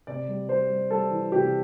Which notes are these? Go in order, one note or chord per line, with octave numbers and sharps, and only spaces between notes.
C3 D5
G3
G3 C5
G3
G3 A4
E3
C3 G4